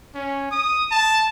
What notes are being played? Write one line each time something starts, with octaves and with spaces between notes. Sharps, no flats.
C#4
D#6
A5